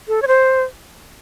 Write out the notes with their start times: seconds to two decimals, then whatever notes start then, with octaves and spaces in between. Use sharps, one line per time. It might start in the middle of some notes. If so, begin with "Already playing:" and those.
0.08 A4
0.22 C#5
0.28 C5